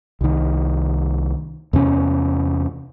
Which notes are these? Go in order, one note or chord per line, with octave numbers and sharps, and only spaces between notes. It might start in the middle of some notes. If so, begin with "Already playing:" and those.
C2 D#3
E2 C3 C#4